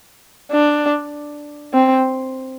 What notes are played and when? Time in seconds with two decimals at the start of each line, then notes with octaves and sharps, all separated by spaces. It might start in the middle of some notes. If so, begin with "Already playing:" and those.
0.52 D4
1.74 C4